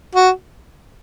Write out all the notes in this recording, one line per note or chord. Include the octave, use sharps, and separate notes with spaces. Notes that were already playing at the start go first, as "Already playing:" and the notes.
F#4